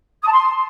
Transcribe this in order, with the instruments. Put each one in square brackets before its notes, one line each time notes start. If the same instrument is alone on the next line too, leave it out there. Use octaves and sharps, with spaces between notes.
[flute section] D#6
A5
C6